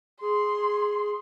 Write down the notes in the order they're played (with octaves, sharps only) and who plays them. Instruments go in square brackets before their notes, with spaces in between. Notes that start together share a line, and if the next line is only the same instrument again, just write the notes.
[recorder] G#4 [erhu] C6